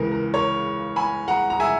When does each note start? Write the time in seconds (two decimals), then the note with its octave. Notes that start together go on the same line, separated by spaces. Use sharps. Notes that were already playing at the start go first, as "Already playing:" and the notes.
Already playing: C#2 C#3 E3 A#4
0.12 A#4
0.33 A#4 C#5
0.96 G#5 B5
1.28 F#5 A#5
1.50 A#5
1.60 E5 G#5